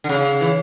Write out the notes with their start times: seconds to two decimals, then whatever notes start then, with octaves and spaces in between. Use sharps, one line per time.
0.04 D3
0.09 C#3
0.41 E3